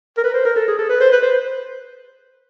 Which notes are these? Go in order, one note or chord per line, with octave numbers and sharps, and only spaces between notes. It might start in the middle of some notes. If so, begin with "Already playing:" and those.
A#4
B4
C5
A#4
A4
G#4
A4
B4
C5
B4
C5